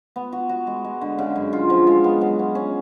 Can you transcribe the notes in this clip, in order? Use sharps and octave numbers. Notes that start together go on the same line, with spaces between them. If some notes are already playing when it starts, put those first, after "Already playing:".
B3
F#4
F#4
G#3
G#3
D3
C#3
F#2
F4
F3
G#3
B3
F#3
C#4
C#4